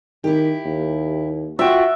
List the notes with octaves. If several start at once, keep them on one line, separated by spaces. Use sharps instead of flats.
D#3 E4 G4
D#2
F4 F#4 E5 G5